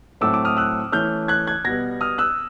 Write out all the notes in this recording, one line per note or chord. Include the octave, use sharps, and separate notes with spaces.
A2 F#3 A3 C4 D6 E6
D6 E6
D#6 F6
E6 F#6
E3 A3 C#4 F6 G6
F#6 G#6
F#6 G#6
B2 G3 B3 G#6 A#6
D#6 F6
E6 F#6